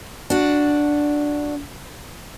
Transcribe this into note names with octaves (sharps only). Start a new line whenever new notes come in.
D4 F#4